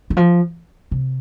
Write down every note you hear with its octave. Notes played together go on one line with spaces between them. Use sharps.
D#3
F3
C3